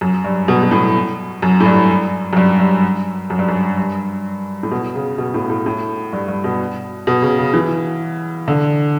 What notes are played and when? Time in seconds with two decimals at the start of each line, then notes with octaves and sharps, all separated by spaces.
0.01 F#2
0.24 G2
0.48 B2
0.63 B2
0.71 A2
1.42 F#2
1.60 A2
1.66 G2
2.33 F#2
2.37 G2
2.59 G2
3.30 F#2
3.39 G2
3.48 F#2
3.77 G2
4.63 A2
4.71 B2
4.95 C#3
5.18 B2
5.34 A2
5.50 A2
5.66 A2
6.13 G2
6.28 G2
6.44 B2
7.07 B2
7.22 C#3
7.38 C#3
7.54 E3
8.48 D3